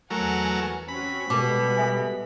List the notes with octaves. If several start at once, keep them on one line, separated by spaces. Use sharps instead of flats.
E2 F#3 A3 A#4 F#5 G#5
C4 C#4 F#4 B5
B2 G3 G#3 B3 A4 D6
A4 E5 G#5